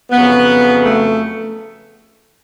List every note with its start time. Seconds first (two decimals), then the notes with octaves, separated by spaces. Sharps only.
0.12 F2 C#3 F#3 B3
0.85 A3